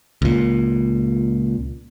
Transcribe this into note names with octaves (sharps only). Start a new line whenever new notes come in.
C#2 A#2